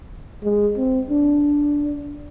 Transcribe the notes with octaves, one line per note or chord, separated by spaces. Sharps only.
G#3
C4
D4